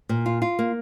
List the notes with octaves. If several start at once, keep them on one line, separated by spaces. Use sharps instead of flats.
A#2
F4
F4
A#3